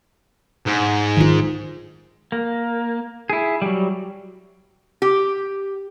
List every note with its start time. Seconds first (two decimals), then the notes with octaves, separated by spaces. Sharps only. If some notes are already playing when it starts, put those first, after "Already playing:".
0.66 G#2
1.17 D#3 F4
2.32 A#3
3.30 E4 G#4
3.62 F#3 G3
5.02 G4